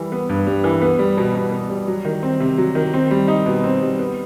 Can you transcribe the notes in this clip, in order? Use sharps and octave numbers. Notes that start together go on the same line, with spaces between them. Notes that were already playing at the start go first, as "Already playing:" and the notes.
Already playing: E3 G3
B3
G2
G3
E3
B3
G3
B2
B2
B3
G3
F#3
D#3
C4
C3
F#3
D#3
C4
G3
D#4
B2
C4
G3
B3